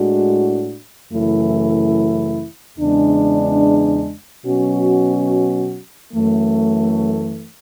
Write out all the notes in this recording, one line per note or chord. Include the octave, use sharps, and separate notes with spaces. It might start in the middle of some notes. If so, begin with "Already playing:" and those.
Already playing: A2 G#3 D4 F#4
F#2 C#3 E3 A3 E4
E2 C#3 G#3 D4
B2 F#3 C#4 F#4
F#2 E3 A3